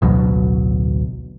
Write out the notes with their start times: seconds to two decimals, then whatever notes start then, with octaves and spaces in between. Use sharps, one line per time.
0.02 A1 D2 B2 F#3